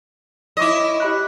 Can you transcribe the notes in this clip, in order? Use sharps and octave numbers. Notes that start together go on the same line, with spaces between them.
E4 C#5 D#5 C#6 D6
G4 B5 F#6